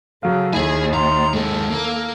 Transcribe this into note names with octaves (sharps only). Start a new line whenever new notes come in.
C#3 F#3 A4 F5
D#2 E4 G#4 G#5
A#5 C6
G#3 A#3 A4
A#3 A#4